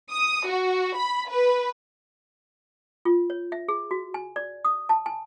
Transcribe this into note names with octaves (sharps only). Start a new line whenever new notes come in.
D#6
F#4
B5
B4
F4
C#5
E5
G#4
F#4
G#5
D5
D#6
A5
G#5